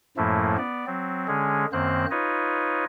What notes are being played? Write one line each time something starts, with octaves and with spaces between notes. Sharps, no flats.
F#2 A2 F3 A3 A#3 E4
B3 D5
F#3 C4
D3 G#3 C#4 G#4
F#2 D#3 A#3 C4 C5 F#6
D#4 F4 B4 C#5 D#5